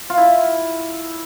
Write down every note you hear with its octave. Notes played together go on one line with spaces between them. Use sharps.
F4
E4